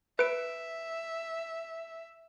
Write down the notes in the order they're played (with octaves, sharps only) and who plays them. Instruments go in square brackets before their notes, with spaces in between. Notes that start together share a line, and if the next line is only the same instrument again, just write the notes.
[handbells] B4 D7 [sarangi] E5